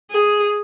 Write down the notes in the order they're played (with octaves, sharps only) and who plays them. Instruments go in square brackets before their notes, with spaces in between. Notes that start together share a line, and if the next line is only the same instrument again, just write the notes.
[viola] G#4